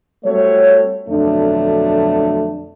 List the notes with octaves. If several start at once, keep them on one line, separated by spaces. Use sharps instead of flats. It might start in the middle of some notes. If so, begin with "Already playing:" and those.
G3 A3 C4 F#4 C#5
F2 B2 D3 F#3 A3 D4